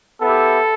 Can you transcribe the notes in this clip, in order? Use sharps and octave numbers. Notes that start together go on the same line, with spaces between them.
B3 E4 G4 A4